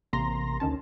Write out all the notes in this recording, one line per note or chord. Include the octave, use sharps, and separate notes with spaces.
A1 C3 A#3 A#5 C6 A#6
D2 D#3 C#4 A5